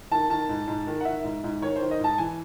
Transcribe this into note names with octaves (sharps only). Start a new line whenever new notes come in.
D#3 A5
D#3 A5
G#2
G#2
D#3
F#5
D#3 E5
G#2
G#2
D#3 C#5
C5
D#3
D#5
G#2 A5
E3 G#5